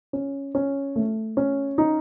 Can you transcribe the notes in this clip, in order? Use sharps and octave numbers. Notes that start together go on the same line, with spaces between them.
C#4
C#4
A3
C#4
D#4